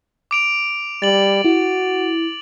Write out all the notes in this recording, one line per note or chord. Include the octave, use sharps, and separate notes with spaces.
D6 D7 F7
G3 A6 F#7
E4 F#4